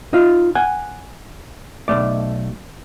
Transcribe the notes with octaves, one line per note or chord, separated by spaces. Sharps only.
D#4 F4
F#5 G#5
B1 C#3 A3 D5